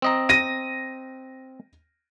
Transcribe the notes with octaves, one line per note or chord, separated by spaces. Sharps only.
C4 D#5 A#5
A#6 D#7